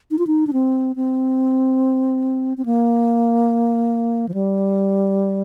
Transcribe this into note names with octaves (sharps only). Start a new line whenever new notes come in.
D#4
F4
D#4
D4
C4
C4
C4
A#3
F3
G3